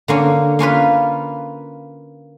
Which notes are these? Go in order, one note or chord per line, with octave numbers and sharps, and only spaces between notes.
D3 A#3 C#4
A#3 C#4 F4 B4